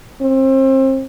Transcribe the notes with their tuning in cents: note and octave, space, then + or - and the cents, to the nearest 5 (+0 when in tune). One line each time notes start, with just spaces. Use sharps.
C4 +30